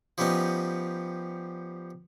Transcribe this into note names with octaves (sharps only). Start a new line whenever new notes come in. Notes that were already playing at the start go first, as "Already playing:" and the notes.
F3 G3 B3 C#4 D#4